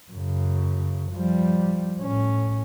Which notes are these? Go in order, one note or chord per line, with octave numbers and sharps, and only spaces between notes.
F#2 C#3
F3 G3
A2 C#4